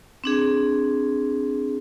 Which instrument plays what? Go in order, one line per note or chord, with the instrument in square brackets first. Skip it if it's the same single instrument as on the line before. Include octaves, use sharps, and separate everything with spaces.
[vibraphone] C4 D4 G#4